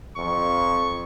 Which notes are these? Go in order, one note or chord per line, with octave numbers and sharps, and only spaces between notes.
F2 C#6